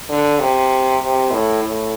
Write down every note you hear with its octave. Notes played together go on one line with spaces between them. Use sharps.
D3
C3
C3
A2
A2